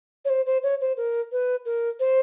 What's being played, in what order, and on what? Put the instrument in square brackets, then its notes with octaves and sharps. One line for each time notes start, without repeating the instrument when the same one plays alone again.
[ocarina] C#5
C5
C5
C#5
C5
A#4
B4
A#4
C5